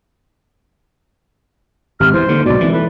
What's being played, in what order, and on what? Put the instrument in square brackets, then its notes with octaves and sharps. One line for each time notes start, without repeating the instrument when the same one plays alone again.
[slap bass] G#1 [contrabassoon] C3 [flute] F6
[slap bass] E2 [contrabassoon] E3 [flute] C5
[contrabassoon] D#2 [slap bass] D3
[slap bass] B1 G#2 [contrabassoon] B2 [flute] D5
[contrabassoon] G#1 [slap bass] E3
[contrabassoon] A2 [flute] B4